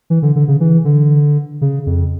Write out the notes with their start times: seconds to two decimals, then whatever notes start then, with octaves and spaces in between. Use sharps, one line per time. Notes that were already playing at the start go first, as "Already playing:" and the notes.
0.10 E3
0.22 D3
0.36 D3
0.48 C#3
0.60 E3
0.85 D3
1.61 C#3
1.86 F2